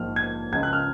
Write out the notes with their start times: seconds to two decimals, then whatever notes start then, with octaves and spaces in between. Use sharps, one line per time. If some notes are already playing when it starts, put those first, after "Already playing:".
Already playing: A#1 G#2 F3 F6
0.16 G#6
0.52 C#2 C#3 F3 G#3 G#6
0.63 F#6
0.73 F6